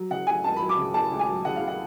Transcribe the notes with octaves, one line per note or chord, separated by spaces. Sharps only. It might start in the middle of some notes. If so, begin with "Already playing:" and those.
Already playing: F#3
C#3 F#5
A3 G#5
C#2 A5
B5
F#3
D6
C#3
A3 A5
C#2
G#5
F#3
C#3 F#5
F5
A3
F#5